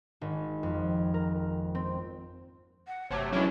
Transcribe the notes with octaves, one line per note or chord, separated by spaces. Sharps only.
G#1
F2
A#4
C4
F#5
G1 C3 F#3 A3 C#5 D6
E3 F#3 G#3 C#4 D4 E4